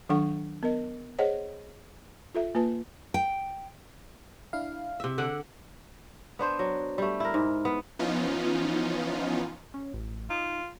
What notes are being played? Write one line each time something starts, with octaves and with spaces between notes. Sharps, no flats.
D#3 F#3 D4 A4 F#5 C#6
B3 A#4 D#5
G#4 C5 C#5 D#5 F#5
F4 A4 E5
A#3 F4 B4 A5
G5
D4 E4 F5
C3 E5
D3 D4 F#5
B3 D4 C5
F#3
G3 A3
E4 A#4
G#2
B3
E3 F3 B3 C#4 D#4 F4
C#4
A1
D#4 F4